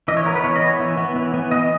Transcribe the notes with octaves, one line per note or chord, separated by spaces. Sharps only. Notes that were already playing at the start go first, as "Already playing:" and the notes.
E3 D#5
C#5
B3 A#4
B4
E3 C#5
D#5
B3
C#5
E3
B3
E3
B3
E3 D#5